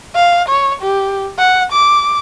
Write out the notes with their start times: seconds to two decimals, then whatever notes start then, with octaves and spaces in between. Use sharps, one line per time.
0.15 F5
0.48 C#5
0.82 G4
1.39 F#5
1.72 D6